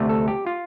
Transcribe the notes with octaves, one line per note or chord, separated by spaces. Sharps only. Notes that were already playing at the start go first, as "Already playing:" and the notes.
Already playing: D2 C3 A3
A4
G4
F4